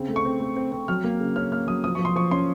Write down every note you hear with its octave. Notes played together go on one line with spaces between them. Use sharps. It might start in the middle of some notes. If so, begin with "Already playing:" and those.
Already playing: C#3 C4
A3
C#6
C4
A3
C4
C4
F#3 F6
A#3
C#3
C#4 F6
A#3 F6
F#3 D#6
F3 D#6
F3 C#6
C6
F3 C#6
C#4 C6